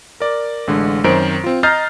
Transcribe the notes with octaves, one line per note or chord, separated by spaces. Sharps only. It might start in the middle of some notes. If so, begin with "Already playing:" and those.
A#4 D5
A1 D3 G#3
F#2 D#3 C4 C5 D7
C4 F4
D#5 A#5 F6 G6 A6 C7